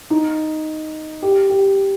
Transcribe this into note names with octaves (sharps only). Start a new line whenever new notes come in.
D#4
G4
G4